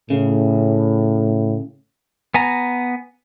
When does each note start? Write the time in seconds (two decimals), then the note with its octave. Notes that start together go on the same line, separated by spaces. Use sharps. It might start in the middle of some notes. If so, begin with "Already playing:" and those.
0.10 A2 C#3
2.34 B3 G#5 A#5